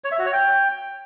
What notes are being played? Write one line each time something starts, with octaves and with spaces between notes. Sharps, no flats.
C#5
E5
F#4
C#5
G5